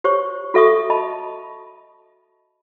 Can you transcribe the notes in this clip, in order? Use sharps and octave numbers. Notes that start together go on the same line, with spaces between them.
G4 C5 C#5 C#6
F#4 A4 E5 C#6 D#6
D#5 A5 B5